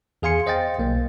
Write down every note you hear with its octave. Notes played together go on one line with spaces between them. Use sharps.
E2 G#4 F5 G#5 C6 C#7
C5 D#5 F5 G5 A6
B1 A#3